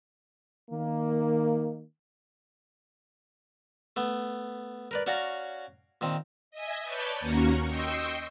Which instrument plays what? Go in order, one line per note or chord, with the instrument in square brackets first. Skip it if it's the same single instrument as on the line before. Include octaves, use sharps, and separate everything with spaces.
[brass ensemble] D#3 A#3
[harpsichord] A3 B3
A#4 B4 D5
C#4 F#4 C#5 D5 F5 A#5
A#2 D#3 C4
[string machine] D#5 E5 G#5
B4 C#5 D5 A5 G6
D#2 A#3 C#4 F#4 A#5 C#6
D#5 G5 C6 C#6 E6